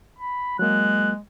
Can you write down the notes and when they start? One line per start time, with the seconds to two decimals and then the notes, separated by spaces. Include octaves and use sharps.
0.19 B5
0.59 F#3 G#3 A#3 F#6